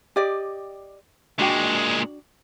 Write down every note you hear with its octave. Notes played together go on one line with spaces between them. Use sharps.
G4 D5 D#5
A#2 G#3 D4 F#4 G5